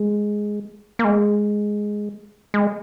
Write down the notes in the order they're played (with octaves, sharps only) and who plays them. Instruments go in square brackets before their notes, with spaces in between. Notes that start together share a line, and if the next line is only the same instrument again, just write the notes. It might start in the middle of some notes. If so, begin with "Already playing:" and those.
Already playing: [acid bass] G#3
A#3
G#3
G#3